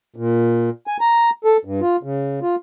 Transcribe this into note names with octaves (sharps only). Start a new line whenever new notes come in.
A#2
G#5
A#5
A4
G2
F4
C#3
F4